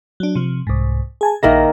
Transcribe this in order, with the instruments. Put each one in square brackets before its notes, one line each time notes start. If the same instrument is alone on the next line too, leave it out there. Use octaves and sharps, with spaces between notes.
[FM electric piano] F#3 D4
C3 F3
C2 G#2
G#4 G#5 A5
[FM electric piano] A#1 A#6 [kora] D#3 A#3 E5